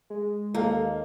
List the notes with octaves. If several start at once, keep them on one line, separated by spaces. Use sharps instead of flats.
G#3
D#2 A#3 A4 A#4 D#5 F5